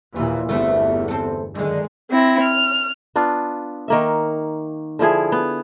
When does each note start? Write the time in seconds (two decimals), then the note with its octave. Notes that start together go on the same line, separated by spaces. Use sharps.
0.16 D#2 A#2 E3 F4
0.49 G1 E2 G2 A3 B3 C4
1.08 C4 A4
1.55 F#2 D3 D#3 G#3
2.10 C4 E4 A#6
2.41 F6
3.16 B3 D4 F4
3.88 D#3 A#3 E5
4.99 D3 F3 E4 G#4
5.32 B3